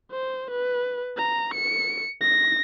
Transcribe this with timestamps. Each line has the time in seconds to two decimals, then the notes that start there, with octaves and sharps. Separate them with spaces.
0.12 C5
0.51 B4
1.18 A#5
1.54 C#7
2.21 A#6